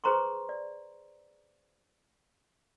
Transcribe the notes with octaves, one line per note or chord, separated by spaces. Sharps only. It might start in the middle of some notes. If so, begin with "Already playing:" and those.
G#4 B4 C5 A#5 C6 C#6
D5